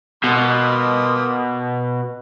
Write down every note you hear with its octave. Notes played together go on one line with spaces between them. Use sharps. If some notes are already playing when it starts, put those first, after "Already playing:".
B2 A#3 C6 D#6